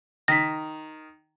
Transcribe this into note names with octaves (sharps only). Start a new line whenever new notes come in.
D#3 A#6 B6